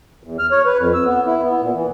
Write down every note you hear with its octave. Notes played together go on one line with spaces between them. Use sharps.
E2
F6
C#5
B4
F2
E6
B3
E4
B3
A#2
E3